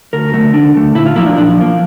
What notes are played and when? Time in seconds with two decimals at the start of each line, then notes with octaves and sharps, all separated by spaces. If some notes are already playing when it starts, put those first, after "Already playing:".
0.13 D2 A#4
0.34 D3 A3
0.54 D2 D4
0.75 D3 A3
0.95 A#2 E4
1.06 F4
1.16 F3 A#3 E4
1.26 D4
1.37 A#2 D4
1.57 F3 A#3